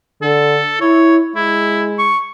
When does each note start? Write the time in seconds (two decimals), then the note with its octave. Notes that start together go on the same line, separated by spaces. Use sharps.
0.22 D3 A4
0.81 E4 C#5
1.35 G#3 E4
1.99 C#6